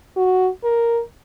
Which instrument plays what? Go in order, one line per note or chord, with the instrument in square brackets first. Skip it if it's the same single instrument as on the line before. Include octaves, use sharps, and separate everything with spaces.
[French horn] F#4
A#4